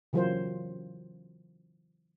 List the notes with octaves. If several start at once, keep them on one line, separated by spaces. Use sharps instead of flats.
C#3 E3 F#3 F4 A#4 C5